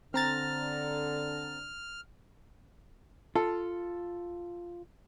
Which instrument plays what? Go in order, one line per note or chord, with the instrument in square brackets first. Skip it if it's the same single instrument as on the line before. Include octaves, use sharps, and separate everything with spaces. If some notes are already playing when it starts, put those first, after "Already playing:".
[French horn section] D3 [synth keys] C4 A#5 A6 [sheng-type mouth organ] F6
[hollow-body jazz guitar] F4 [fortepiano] A4